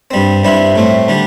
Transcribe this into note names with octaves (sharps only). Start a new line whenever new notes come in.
G2 G3 C4
G2 G3 C4 E4
A2 A3 C4
D3 G3 D4